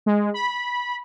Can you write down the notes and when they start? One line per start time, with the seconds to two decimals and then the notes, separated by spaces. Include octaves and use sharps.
0.06 G#3
0.34 B5